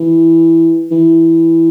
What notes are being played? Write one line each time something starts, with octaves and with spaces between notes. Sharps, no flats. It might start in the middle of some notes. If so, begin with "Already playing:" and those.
Already playing: E3
E3